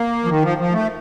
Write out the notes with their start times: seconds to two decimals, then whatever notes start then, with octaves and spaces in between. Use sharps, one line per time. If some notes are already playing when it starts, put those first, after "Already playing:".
Already playing: A#3
0.24 F3
0.28 D#3
0.43 F3
0.58 F3
0.72 A3